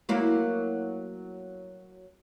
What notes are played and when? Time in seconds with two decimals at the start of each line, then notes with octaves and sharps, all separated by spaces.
0.09 F#3 A#3 E4